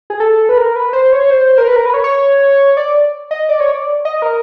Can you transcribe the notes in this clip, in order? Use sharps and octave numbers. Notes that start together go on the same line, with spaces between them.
G#4
A4
B4
A#4
B4
C5
C#5
C5
A#4
B4
A#4
B4
C#5
C#5
D5
D#5
D5
C#5
D5
D#5
A#4